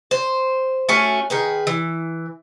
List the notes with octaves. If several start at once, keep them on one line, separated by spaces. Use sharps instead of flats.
C5
A3 C#4 F#4 G#5
D#3 G#4 B4
E3